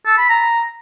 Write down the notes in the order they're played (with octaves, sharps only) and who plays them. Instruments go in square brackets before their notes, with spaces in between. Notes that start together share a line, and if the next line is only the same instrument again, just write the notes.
[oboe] A4
B5
A#5